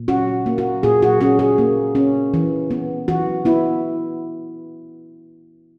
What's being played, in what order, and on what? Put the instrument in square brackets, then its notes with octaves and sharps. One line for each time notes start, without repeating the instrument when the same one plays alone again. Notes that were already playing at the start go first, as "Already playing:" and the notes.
Already playing: [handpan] A#2
C#4 F#4
A#3
F#4
A#2 G#4
F#4
C#4 G#4
G#4
A#3
C#4
E3
B3
E3 F#4
B3 E4